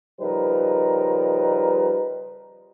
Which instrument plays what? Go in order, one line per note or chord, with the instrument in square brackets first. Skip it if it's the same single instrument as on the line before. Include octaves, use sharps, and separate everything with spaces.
[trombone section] C#3 F3 G3 D#4 A#4 B4